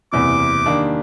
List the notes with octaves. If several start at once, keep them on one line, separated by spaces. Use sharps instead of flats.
F#1 E2 C3 E3 D6
D#3 G3 A#3 D4 G4